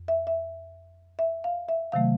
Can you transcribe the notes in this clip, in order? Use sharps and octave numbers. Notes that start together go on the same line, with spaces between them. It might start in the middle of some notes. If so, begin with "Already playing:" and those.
Already playing: F2
E5
E5
E5
F5
E5
C3 D#3 F#3 A3 F5